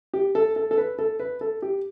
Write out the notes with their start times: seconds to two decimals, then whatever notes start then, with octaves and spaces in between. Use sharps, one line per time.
0.14 G4
0.35 A4
0.56 A4
0.71 A4
0.78 B4
0.99 A4
1.20 B4
1.41 A4
1.62 G4